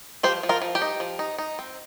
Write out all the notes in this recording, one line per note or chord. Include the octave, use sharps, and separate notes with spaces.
F3 G4 C5
F3
F4 A#4
F3
G4
D#4
F3
D#4
D#4
C4